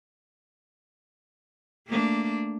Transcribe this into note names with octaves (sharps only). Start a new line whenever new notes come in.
A3 A#3 D4